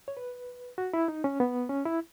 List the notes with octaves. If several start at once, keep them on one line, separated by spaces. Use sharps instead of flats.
C#5
B4
F#4
E4
D#4
C#4
B3
C#4
E4